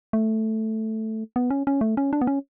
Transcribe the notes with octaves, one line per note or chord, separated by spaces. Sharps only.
A3
B3
C#4
C#4
A3
C#4
D4
B3
C#4